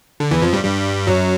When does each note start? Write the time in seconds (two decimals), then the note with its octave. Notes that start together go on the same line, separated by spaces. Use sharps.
0.20 D3
0.31 E2 E3
0.42 F2 F3
0.53 G2 G3
0.64 G2 G3
1.07 F#2 F#3